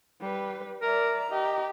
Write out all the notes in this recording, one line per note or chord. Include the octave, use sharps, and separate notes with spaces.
G3 B4
A#4 D5 E5 A#5
G4 D#5